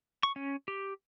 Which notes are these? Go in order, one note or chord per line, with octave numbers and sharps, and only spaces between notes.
C#6
C#4
G4